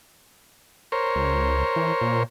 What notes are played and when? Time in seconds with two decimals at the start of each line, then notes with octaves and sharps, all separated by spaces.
0.92 A#4 C5 C#5
1.16 C#2
1.76 E3
2.01 A#2